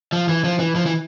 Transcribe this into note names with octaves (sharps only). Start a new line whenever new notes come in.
F3
E3
F3
E3
F3
E3